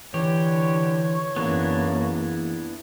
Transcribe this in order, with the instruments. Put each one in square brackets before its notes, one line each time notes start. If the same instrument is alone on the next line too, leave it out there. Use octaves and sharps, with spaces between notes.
[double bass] D3 [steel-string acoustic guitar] E3 [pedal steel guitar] G4 [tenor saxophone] C#5
[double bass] F#2 A#3 [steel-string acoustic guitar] E3 G#4 [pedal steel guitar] B3 D4 E4